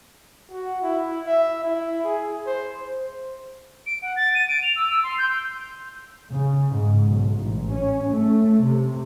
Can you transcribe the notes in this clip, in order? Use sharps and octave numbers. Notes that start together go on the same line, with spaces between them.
F#4
E4
E5
E4
G#4
C5
D7
F#5
A6
D#7
D7
F7
E6
E6
C6
G6
C#3
G#2
B1
A1
C#4
A3
C3